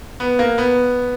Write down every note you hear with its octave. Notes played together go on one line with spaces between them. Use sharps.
B3
A#3
B3